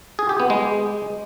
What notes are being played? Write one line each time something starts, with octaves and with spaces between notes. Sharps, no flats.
G#4
G4
B3
G#3